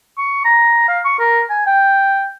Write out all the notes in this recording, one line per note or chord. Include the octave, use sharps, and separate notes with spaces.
C#6
A#5
F5
C#6
A#4
G#5
G5